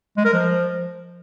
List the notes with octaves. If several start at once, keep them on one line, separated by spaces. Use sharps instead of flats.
G#3
A#4
F3